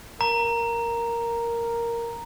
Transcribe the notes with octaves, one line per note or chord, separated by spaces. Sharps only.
A#4 A#5